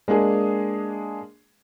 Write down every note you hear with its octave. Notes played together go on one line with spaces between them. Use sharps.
G#3 A#3 D4 G#4